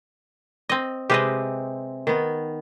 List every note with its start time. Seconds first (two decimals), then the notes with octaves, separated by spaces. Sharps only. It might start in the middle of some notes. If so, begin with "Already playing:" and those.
0.69 C4 D#5
1.10 C3 G#3 C4 G4 B4 D#5
2.07 D#3 B3